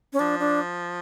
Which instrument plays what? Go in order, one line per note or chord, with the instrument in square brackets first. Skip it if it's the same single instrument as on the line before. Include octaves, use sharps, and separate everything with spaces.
[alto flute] C#4
[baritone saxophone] F3 [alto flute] D4
[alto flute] D4